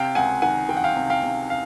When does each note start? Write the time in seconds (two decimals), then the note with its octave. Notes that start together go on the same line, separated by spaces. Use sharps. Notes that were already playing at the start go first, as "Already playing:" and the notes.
Already playing: C3 F5 G5
0.15 C#2 F#5 G#5
0.42 D#3 F#5 G#5
0.69 D#3 G5
0.77 F#5
0.84 F5 G5
0.96 C3
1.10 F5 G5
1.23 C3
1.50 F5